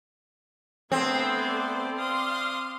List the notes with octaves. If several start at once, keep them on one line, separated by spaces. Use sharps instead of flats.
A3 B3 C4 G#4 A4 C5
D5
F5 C6 D#6